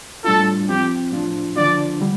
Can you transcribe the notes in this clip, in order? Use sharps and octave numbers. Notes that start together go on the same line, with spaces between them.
A2 G3 D4 F4 A4
F3 C4 F4 G4
A2 F3 D4 F4
D3 F3 D4 F4 D5
D3 G3